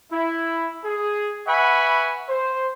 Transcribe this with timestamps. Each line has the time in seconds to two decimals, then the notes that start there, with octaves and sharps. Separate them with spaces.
0.12 E4
0.84 G#4
1.47 B4 E5 F#5 G#5 B5 C#6
2.29 C5